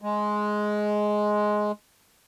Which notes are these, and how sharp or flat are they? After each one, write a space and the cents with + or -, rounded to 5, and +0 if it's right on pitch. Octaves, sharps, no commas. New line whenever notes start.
G#3 +10